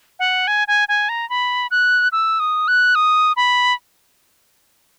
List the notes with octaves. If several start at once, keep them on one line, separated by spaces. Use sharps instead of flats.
F#5
G#5
G#5
G#5
A#5
B5
F#6
E6
D#6
F#6
D#6
B5